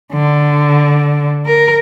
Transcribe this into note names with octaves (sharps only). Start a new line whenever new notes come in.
D3
A#4